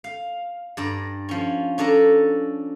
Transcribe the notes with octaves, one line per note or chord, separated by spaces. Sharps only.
F5
G2 D5 A#5
F3 C#4
C#4 D4 A4 A#5